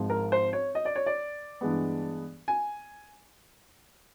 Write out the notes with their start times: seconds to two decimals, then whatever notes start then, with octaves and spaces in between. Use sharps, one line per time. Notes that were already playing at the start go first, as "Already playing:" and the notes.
Already playing: G#1 G#2 F3
0.10 A#4
0.32 C5
0.53 C#5
0.75 D#5
0.85 D5
0.96 C#5
1.06 D5
1.61 G2 E3 G#3 B3
2.48 G#5